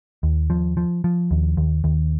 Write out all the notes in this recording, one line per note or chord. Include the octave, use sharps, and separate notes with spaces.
D#2
F3
F3
F3
D#2
D#2
D#2